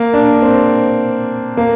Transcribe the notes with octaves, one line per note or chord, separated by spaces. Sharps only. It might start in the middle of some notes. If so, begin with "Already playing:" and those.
Already playing: A#3
D4
C4
A#3